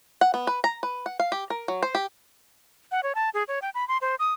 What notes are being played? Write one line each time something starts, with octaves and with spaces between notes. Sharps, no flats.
F#5
B3
B4
A#5
B4
F#5
F5
G4
A#4
F#3
C5
G4
F#5
C#5
A5
G#4
C#5
G5
B5
C6
C5
D#6